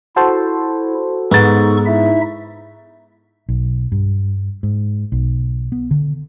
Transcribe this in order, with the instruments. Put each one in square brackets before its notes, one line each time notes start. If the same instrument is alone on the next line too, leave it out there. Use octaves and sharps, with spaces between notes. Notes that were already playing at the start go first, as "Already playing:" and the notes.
[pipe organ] E4 [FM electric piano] F#4 A4 C5
[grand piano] G#2 A6 [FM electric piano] B3 [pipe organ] D#4 A4 C#6
[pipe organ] D#4 E4 E5
[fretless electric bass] B1
G2
G#2
B1
B3
D3